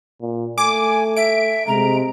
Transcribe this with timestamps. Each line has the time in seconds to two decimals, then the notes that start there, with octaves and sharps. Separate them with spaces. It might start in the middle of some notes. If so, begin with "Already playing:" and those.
0.21 A#2
0.58 A3 G#5 D6
1.17 E5 D7
1.67 C3 G#3 A#5